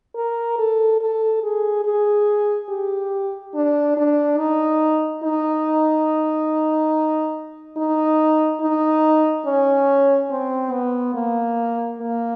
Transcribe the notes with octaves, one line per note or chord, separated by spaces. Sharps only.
A#4
A4
A4
G#4
G#4
G4
D4
D4
D#4
D#4
D#4
D#4
C#4
C4
B3
A#3
A#3